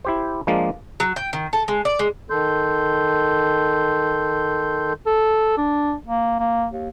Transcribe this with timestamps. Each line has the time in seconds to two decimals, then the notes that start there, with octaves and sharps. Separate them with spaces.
0.05 E4 G4 C5
0.47 F3 G#3 A#3 D4
1.00 F#3
1.16 G5
1.33 D#3
1.53 A4
1.68 G#3
1.85 D5
1.99 G#3
2.30 D#3 A4 C6 G6
5.06 A4
5.57 D4
6.06 A#3
6.40 A#3
6.71 D#2